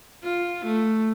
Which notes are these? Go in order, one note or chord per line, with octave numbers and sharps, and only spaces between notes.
F4
A3